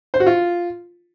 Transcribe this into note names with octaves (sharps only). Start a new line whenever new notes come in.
C5
F#4
F4